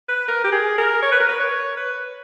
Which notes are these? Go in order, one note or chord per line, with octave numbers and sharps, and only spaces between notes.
B4
A#4
G4
G#4
A#4
C#5
B4
A#4
B4
C#5
B4